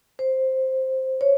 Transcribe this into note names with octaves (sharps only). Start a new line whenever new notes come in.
C5
C#5